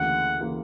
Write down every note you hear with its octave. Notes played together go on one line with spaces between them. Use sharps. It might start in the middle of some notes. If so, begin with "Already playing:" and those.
Already playing: D2 C#3 E3 A#3 F#5
C#3 E3 A#3